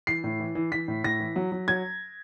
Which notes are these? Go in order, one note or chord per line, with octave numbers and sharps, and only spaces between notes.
E3 C7
A2
E3
E3
E3 B6
A2
A2 A#6
E3
F#3
F#3
F#3 G#6